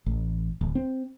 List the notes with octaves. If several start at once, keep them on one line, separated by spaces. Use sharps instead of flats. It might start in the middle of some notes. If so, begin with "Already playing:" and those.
A1
D1
C4